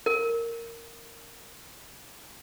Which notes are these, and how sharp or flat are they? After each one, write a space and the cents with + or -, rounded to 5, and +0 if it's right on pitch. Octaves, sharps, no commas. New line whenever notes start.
A#4 -10